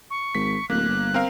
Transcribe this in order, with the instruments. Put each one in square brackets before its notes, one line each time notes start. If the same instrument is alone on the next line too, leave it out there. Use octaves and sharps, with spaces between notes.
[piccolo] C#6
[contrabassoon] G#1 [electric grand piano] B6
[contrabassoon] D1 [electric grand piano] A#3 [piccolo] F#6
[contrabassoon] G1
[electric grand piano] C4 A#4 F5